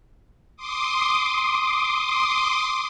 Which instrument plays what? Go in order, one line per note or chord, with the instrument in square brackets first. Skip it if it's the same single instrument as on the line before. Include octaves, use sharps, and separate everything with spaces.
[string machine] C6 D6 D#6